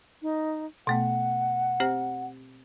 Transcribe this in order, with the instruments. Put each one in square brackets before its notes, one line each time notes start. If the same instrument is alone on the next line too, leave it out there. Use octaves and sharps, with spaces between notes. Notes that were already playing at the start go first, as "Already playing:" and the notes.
[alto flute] D#4
[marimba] B2 A3 B3 [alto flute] F#5
[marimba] C4 G4 C5